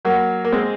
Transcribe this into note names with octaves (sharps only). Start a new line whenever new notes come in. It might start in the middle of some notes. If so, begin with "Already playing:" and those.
F#3 A#3
A#3
G#3 C4